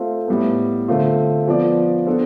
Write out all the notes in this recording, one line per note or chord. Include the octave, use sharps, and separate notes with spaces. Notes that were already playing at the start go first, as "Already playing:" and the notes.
Already playing: A3 C4 F4 C5
A2 G3 B3
D3 A3 C4 F4
F3 B3 F4 B4 D5
B3 D4 A4 C5